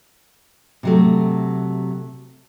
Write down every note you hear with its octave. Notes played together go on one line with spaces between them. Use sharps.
C3 F#3 A3